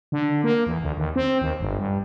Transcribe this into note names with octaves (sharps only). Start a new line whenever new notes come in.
D3
A#3
E2
D2
D#2
C4
D#2
G1
G2